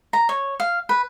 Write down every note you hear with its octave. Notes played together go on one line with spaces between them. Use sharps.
A#5
C#5
F5
B4